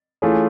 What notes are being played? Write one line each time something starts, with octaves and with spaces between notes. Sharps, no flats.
E3 A3 C#4 F4 G#4